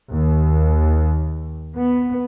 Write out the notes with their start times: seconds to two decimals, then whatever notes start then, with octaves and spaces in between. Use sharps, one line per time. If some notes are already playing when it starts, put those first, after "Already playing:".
0.11 D#2
1.75 B3